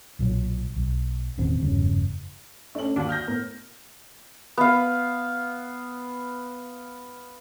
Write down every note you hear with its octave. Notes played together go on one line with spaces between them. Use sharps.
B1 A#2 F#3
B1
E1 A1 D#2 C4
F1 E2 G2 C#3
A3 C#4 D4 F#7
D#2 D4 F#4
F6 G6 A#6
A2 B3 A#4
B3 F5